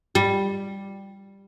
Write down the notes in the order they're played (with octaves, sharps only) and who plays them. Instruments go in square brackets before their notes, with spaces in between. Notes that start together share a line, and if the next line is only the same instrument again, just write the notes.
[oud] G3